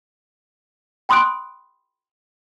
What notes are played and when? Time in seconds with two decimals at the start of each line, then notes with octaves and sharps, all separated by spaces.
1.09 G5 B5 C6 D#6 F#6 D7